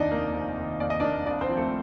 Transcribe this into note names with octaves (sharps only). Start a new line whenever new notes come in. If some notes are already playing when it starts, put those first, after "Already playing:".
Already playing: F1 D#2 D#3 D4 D#4 D5 D#5
A#3
F1
D#3
D#2 D5
D#5
A#3 D4 D5
C2 D4 D5
C4 C5
F3
A3 A4